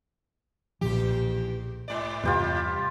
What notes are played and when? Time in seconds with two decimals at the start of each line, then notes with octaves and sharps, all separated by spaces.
0.81 B1 E2 A#2 F3 G4
1.88 G#2 D5
2.23 E2 G2 C3 F4 G4 B4